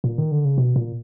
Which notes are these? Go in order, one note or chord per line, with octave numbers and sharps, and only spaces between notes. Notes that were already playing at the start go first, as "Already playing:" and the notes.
A#2
D#3
D3
C#3
B2
A#2